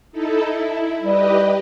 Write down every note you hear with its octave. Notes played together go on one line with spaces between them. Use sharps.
D#4 E4 A4
E4
G3 G4 B4 D#5